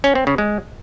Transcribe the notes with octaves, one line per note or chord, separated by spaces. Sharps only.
C#4
C4
C#3
G#3